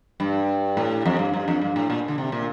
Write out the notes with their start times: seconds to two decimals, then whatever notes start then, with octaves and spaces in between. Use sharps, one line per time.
0.20 G2
0.77 A2
1.06 F2
1.19 G2
1.34 G2
1.48 F2
1.61 G2
1.76 A2
1.90 A#2
2.08 D3
2.18 C3
2.32 A#2